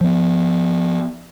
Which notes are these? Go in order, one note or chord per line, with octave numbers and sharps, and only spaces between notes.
F3 B3